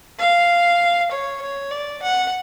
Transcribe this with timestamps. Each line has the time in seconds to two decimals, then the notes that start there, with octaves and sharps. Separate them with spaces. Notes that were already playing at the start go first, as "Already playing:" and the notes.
0.19 F5
1.11 C#5
1.42 C#5
1.71 D5
2.02 F#5